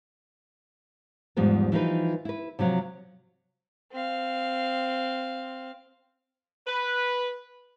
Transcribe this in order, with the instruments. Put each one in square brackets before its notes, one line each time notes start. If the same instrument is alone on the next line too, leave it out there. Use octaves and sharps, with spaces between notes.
[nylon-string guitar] E2 G#2 F3 G3 B3
E3 F3 D#4 B4
E4 B4
C3 F3 F#3
[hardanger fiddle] C4 F5
[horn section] B4